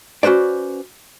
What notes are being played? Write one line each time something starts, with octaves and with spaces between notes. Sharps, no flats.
C#4 F#4 B4 C5 D5